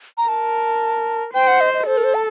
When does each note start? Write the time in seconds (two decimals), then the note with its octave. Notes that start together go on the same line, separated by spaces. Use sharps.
0.18 A#5
0.28 A#4 A5
1.34 C5 G5
1.47 F#5
1.61 D#5
1.74 D#5
1.87 A4 C5
1.97 A#4
2.04 C5
2.15 A5